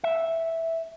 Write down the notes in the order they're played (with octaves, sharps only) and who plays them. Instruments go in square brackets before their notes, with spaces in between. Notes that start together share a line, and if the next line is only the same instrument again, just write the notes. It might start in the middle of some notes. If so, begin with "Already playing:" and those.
[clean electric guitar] E5